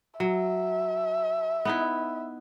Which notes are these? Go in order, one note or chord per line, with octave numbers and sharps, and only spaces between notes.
F#3 E5
B3 D#4 E4